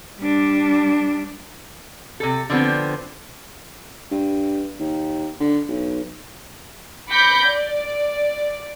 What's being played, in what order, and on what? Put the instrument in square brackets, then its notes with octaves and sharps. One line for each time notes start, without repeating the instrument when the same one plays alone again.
[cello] G3 D4
[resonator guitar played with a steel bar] C3 A4
D3 F3 B3 C4
[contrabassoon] G2
D#2
D3
B1
[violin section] B5 D6 G6 A#6 B6 C#7
D5